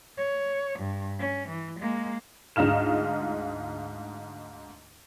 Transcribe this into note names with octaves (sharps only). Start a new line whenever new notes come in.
C#5
G2
C#4
E3
G#3 A#3
D2 G#2 D#4 F4 F6 E7